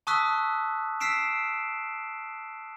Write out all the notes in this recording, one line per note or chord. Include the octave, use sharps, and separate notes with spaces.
A5 C#6 D#6 E6 F#6 B6
E6 F6 B6 C7 D7 E7